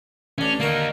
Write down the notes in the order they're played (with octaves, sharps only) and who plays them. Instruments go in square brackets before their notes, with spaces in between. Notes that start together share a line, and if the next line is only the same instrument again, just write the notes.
[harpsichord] A1 D4 [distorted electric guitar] C#4
[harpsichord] D3 A#4 C#6 [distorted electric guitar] A#3 D#4